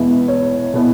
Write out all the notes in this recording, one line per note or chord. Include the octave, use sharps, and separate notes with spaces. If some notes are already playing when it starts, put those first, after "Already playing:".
Already playing: E2 B2 G#3 B3 E4 E5
C#5
B2 B3 E4 B4